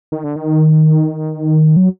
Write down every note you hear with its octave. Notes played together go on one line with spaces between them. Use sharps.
D#3
D3
D#3
F#3